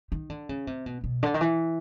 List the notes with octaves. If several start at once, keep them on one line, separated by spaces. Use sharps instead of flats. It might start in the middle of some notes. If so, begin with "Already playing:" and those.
D#3
D3
C#3
C3
B2
B2
D3
D#3
E3